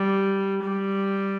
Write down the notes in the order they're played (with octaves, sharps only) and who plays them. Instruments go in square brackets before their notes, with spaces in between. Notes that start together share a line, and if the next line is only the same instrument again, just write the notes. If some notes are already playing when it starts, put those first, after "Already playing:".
Already playing: [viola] G3
G3